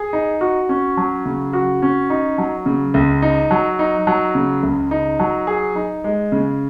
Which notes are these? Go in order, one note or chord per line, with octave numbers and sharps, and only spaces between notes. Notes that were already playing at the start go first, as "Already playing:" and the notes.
Already playing: G#4
D#4
F#4
C#4
F#3
C#3
F#4
C#4
D#4
F#3
C#3
C#2
D#4
F#3
D#4
F#3
C#3
C#2
D#4
F#3
G#4
D#4
G#3
C#3